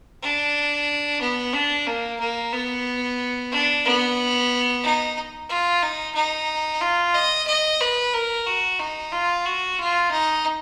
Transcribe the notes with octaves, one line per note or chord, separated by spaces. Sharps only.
D4
B3
D4
A#3
A#3
B3
D4
B3
D#4
F4
D#4
D#4
F4
D#5
D#5
B4
A#4
F#4
D#4
F4
F#4
F4
D#4